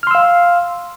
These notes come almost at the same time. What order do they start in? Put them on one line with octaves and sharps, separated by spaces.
F6 C6 E6 F5